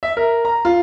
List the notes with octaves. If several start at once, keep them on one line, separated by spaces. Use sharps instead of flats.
E5
A#4
A#5
F4